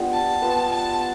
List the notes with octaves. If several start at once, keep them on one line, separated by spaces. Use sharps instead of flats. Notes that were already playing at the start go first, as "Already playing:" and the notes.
Already playing: B3 D4 F4 G4
A5
B3 F4 B4 E5
A5